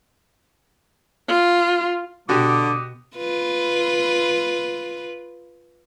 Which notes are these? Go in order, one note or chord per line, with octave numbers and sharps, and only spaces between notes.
F4
B2 D3 F#4 G4 D6 D#6
F4 B4